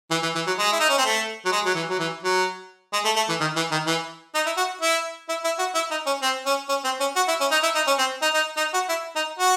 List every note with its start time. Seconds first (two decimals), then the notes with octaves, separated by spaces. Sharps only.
0.11 E3
0.23 E3
0.35 E3
0.47 F#3
0.58 G#3
0.72 E4
0.80 D#4
0.89 C#4
0.98 C4
1.05 A3
1.45 F#3
1.52 G#3
1.65 F#3
1.75 E3
1.89 F#3
1.99 E3
2.23 F#3
2.93 G#3
3.05 A3
3.16 A3
3.29 E3
3.40 D#3
3.56 E3
3.72 D#3
3.87 E3
4.35 D#4
4.46 E4
4.57 F#4
4.81 E4
5.29 E4
5.44 E4
5.59 F#4
5.75 E4
5.91 D#4
6.06 C#4
6.22 C4
6.46 C#4
6.69 C#4
6.84 C4
7.00 C#4
7.16 F#4
7.28 E4
7.40 C#4
7.51 D#4
7.63 E4
7.75 D#4
7.87 C#4
7.99 C4
8.22 D#4
8.34 D#4
8.57 D#4
8.74 F#4
8.89 E4
9.15 D#4
9.39 F#4